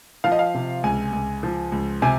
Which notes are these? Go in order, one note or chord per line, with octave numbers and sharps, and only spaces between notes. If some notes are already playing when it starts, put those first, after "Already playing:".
F3 F5
D#5
F5
C3
C#2 G#5
C#2
F3
C#2
C3 G#5